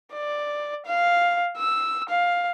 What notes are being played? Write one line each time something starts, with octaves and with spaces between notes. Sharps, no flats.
D5
F5
E6
F5